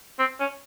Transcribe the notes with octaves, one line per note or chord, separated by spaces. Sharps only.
C4
C#4